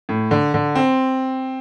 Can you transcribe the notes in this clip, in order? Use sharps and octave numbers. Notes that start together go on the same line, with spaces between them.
A2
D3
D3
C4